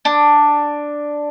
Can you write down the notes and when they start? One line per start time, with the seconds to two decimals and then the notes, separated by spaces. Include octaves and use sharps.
0.05 D4